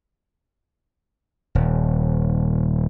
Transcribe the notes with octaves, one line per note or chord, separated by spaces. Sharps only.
D#1